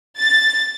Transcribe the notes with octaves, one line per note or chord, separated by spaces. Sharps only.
A6